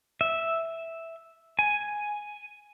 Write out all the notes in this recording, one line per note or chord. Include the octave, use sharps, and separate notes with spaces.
E5
G#5